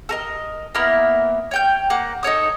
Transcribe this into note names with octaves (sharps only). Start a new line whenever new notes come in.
A4 A#4 D#5
A#3 B3 E4 A#4
C#5 G5 G6
A#3 F#5
D#4 A4 C#5 D#6